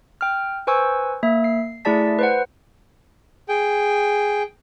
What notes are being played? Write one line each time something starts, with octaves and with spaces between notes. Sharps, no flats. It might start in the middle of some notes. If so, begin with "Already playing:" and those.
G5 F6
B4 C5 G#5 C#6 E6
A#3 E5
C7
A3 E4 G#4 D5 A5 B6
B4 C5 F#5
G#4 G5